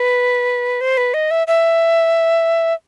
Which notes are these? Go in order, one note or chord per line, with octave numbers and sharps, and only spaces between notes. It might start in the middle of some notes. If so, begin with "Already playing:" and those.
Already playing: B4
C5
B4
D#5
E5
E5